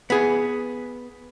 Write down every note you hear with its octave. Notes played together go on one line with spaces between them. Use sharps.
B3 G#4